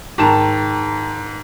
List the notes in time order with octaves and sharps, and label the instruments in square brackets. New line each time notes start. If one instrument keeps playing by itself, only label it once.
[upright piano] G#2 D#3 A5 A#5 E7